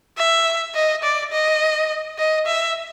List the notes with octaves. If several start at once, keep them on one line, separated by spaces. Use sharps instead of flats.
E5
D#5
D5
D#5
D#5
E5